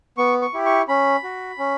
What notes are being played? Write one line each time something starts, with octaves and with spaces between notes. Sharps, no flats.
B3 C#6
C#6
E4 G4
C#6
C#4 B5
F#4
C#4